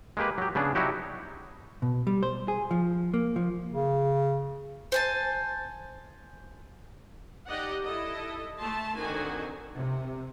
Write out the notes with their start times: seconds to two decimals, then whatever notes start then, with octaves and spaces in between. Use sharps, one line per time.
0.17 G#3 A#3 G4 B4
0.38 F#3 G4
0.55 C#3 B3 D4 G#4
0.75 F#3 D#4 E4 F#4 G4
1.82 B2
2.07 G3
2.23 C5
2.48 G#4
2.71 F3
3.14 A#3
3.36 F3
3.73 C#3
4.92 C5 G#5 A5
7.48 D#4 G4 D5 D#5 F#5
7.84 E4 A4 D#5
8.59 A3 A5 C6
8.98 D3 D#3 C4 D#4 F#4 G#5
9.76 C3